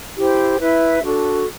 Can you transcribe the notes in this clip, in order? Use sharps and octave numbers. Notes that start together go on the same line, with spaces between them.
E4 G4 C5
E4 B4 E5
D4 F#4 A4